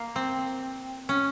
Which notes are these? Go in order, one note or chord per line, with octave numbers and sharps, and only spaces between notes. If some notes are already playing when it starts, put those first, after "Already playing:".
Already playing: A#3
C4
C#4